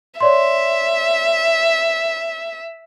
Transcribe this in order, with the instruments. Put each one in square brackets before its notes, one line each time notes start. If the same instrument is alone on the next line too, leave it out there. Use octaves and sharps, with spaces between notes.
[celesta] C#5 D5 C6 [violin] E5